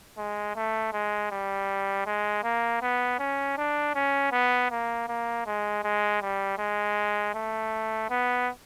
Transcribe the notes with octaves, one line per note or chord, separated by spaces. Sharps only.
G#3
A3
G#3
G3
G#3
A#3
B3
C#4
D4
C#4
B3
A#3
A#3
G#3
G#3
G3
G#3
A3
B3